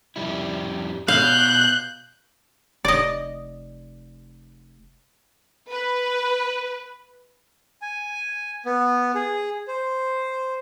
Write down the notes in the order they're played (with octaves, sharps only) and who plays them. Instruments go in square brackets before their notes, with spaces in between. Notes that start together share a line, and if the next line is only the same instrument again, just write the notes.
[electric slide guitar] F2 G3 E4
[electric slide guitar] B2 [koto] F5 [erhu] F#6 [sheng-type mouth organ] G6
[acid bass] F1 [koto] D5 D#5
[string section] B4
[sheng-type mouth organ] G#5
B3
G#4
C5